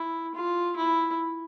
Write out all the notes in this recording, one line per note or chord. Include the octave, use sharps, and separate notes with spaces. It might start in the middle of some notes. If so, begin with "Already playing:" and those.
Already playing: E4
F4
E4